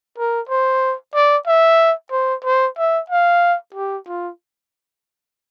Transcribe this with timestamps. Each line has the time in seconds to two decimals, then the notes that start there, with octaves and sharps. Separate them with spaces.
0.18 A#4
0.49 C5
1.14 D5
1.47 E5
2.12 C5
2.44 C5
2.78 E5
3.10 F5
3.74 G4
4.07 F4